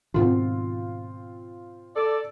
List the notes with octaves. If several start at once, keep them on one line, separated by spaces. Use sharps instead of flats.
G#2 B2 D#3 C4 F4
A4 D5